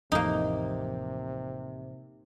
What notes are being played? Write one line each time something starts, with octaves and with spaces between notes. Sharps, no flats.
A1 F2 C3 A#3 D#4